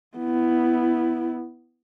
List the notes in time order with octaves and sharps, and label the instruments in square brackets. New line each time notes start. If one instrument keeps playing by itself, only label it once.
[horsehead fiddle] B3 E4